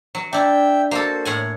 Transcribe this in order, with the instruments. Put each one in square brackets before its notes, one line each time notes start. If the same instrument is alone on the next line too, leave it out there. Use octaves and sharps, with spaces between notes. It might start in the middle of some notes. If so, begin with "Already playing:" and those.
[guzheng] F#3
[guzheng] D4 E4 [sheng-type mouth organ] E5 G5
[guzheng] A#3 A4 [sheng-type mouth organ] F#4 C5
[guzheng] A2 F#5 G#5 [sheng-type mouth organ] C#5